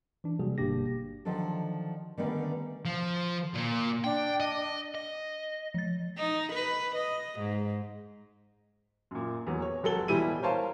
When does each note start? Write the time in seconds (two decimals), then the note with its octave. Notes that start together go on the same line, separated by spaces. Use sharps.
0.24 E3 D4
0.39 C3 F#3 G3 A#3 F#4 G#4
0.58 G1 B2 A#3 D4 G4 A#6
1.25 D3 D#3 F3 F#3 A4
2.18 D3 D#3 G3 A3 B3 C#4
2.85 F3
3.55 A#2
4.04 D4 G5
4.40 D#5
4.95 D#5
5.74 F3 A6
6.18 D#4
6.53 B4
6.95 D#5
7.39 G#2
9.11 F#2 A#2
9.47 E2 F#3
9.62 C#5
9.83 F1 F#3 A4 G7
10.08 B2 E3 G3 E4 D#7
10.43 A#4 C5 C#5 F5 A5 C6